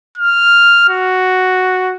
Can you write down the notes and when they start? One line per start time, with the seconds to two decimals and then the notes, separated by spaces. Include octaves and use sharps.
0.18 F6
0.90 F#4